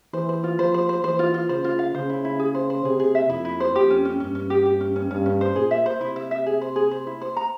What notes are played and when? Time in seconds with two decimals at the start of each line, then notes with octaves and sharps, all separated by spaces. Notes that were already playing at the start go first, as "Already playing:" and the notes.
0.13 E3 C5
0.29 C5
0.44 F4
0.59 F3 C5
0.74 C5
0.89 C5
1.04 E3 C5
1.19 F4
1.34 F4
1.49 C#3 C5
1.64 F4
1.79 F5
1.95 C#3 C5
2.09 E4
2.25 E4
2.39 G#4
2.55 C5
2.70 C5
2.85 C3 G#4
3.00 G#4
3.15 E5
3.30 F2 E4
3.45 E4
3.60 C5
3.75 F2 G4
3.90 C#4
4.05 C#4
4.20 G2 C#4
4.35 C#4
4.50 G4
4.65 G4
4.81 C#4
4.96 C#4
5.10 G2 C#4
5.26 C#4
5.41 C5
5.55 A#2 G#4
5.71 E5
5.86 C5
6.01 C3 E4
6.16 E5
6.31 E5
6.46 G#4
6.62 C5
6.76 G#4
6.91 C5
7.07 E4
7.21 C5
7.37 A#5